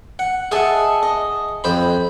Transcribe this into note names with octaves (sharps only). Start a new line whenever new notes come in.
F#5
G#4 D#5 E5 F#5 A5
D#5
F2 C5 B5